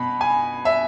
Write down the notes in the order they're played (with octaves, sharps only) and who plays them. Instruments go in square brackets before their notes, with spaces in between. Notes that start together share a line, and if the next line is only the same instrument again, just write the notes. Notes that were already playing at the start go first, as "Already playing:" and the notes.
Already playing: [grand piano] B2 B3 B5
G#5
E5